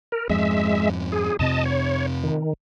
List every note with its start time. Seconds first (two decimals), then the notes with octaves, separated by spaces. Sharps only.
0.12 A#4
0.30 F2 G#2 G#3 E5
1.12 G#4
1.39 F2 C3 C4 D#5 A5
1.65 C#5
2.24 D#3